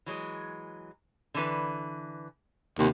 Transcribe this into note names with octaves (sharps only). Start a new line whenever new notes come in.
E3 F#3 G#3
D3 E3 B4
D#2 C3 B3